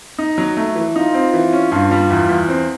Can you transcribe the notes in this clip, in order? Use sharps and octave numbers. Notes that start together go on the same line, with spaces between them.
D#4
F#3
A3
E3
D#4 F4
C4
E3
C#4
G2 F4
G3
E2
E2
C4